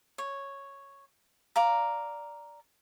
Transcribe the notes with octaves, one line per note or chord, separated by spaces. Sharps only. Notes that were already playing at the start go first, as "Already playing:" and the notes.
C#5
D5 F5 A#5